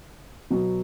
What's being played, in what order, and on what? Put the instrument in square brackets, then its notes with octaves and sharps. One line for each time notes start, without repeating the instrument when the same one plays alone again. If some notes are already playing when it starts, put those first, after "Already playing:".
[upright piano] B2 F#3 B3